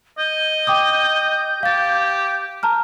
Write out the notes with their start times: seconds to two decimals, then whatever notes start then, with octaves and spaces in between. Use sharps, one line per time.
0.18 D#5 G6
0.67 G5 D6 D#6
1.63 G4 F5 A6
2.63 A5 A#5 F6